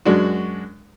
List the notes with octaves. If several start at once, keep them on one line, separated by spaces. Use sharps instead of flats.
F#2 G#3 D4 F#4